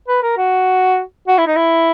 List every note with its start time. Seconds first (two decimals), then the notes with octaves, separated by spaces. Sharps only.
0.08 B4
0.23 A#4
0.37 F#4
1.28 F#4
1.38 E4
1.47 D#4
1.56 E4